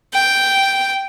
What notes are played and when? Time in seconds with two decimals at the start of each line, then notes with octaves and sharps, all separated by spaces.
0.14 G5